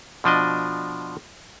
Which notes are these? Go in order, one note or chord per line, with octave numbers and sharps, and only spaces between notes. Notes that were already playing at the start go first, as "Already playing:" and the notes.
B2 F3 D4 D#5